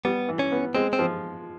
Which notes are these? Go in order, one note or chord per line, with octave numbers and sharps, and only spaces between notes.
G3 B3
E3
C#4
B3
G#3 C4
C4
F3